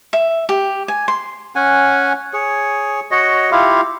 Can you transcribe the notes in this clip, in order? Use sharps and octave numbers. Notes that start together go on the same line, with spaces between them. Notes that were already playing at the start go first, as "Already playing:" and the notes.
E5
G4
G#5
C6
C#4 F#5 G#5
G#4 C#5
F#4 C#5 D#5
E4 F4 G4 F5